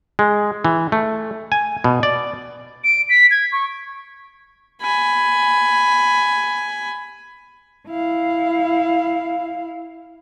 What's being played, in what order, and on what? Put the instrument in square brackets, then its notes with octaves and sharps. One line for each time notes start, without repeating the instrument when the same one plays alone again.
[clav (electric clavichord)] G#3
E3
A3
G#5
B2
D5
[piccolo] D7
B6
G#6
C#6
[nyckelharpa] G#5 B5
[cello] E4 F5